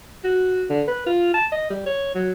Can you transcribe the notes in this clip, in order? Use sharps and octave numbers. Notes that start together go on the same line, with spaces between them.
F#4
D3
B4
F4
A5
D#5
G3
C#5
F#3